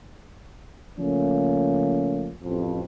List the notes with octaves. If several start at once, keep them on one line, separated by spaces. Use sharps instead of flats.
C#3 F3 A3 A#3 C#4
A1 F2